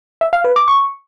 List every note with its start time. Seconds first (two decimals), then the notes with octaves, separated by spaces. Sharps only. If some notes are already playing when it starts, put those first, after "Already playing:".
0.21 E5
0.33 F5
0.44 B4
0.56 D6
0.68 C#6